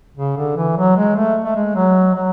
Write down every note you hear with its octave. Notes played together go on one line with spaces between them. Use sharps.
C#3
D3
E3
F#3
G#3
A3
A3
G#3
F#3
F#3